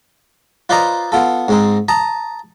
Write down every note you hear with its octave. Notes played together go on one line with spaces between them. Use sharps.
F4 B4 C5 D5 D#5 A#5
B3 F4 A4
G#2 C4 D#4
A5 A#5 D#6